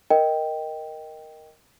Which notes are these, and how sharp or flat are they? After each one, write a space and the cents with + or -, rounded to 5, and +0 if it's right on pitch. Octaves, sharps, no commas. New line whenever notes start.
A#4 +0 D#5 +0 G5 +0